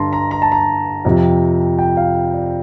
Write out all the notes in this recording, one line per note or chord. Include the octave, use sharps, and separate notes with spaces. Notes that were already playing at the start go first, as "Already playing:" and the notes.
Already playing: G2 D3 G3 A5 A#5 C6
A#5
A#5
A5
A#5
F2 C3 F3
G5
F5
D5